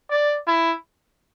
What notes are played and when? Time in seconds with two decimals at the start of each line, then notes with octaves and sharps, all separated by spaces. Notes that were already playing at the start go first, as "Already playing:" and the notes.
0.10 D5
0.47 E4